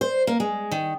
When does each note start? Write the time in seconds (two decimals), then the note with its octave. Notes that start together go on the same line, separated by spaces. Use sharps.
0.01 C5
0.27 A#3
0.40 G#3
0.71 D#3